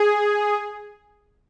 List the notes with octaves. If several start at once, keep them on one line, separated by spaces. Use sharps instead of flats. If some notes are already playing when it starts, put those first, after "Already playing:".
Already playing: G#4